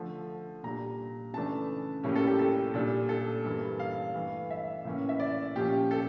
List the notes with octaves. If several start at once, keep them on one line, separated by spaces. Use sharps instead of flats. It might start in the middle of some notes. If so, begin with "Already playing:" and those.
Already playing: D3 F3 A3
A#2 G3 D4 A#5
C#3 E3 A3 D4 A5
A2 G3 A#3 C#4
A4
G4
A4
A#2 G3 D4
A4
G2 E3 G3 A#3
F5
G2 E3 A3
E5
A2 E3 A#3 C#4
E5
D5
A#2 F3 C#4 G4
A4